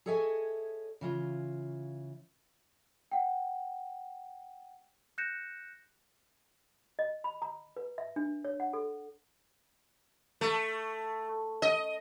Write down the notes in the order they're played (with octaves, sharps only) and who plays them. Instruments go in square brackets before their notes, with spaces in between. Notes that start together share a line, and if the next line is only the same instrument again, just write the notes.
[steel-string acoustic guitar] G#4 A4 C#5 D#5 E5 G#5
C#3 E3 F4
[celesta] F#5 G5
F#6 G6 A#6 C#7 E7
[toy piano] D#5
B5
A#5
B4
E5
D4
C#5
F#5
A4
[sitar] A3
D#5